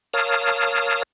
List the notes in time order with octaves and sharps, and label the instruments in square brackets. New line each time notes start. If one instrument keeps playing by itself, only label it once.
[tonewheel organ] A#4 C#5 F5 A5 D#6